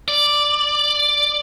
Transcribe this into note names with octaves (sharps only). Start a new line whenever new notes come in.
D5